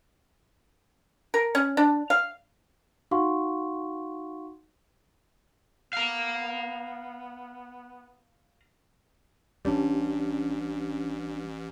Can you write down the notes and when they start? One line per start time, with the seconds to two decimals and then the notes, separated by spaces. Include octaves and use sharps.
1.34 A#4
1.55 C#4
1.77 D4
2.10 F5
3.11 D#4 F#4 F5 F#5 C6 C#6
5.93 B3 F5 A#5
9.65 A1 G3 C#4 D4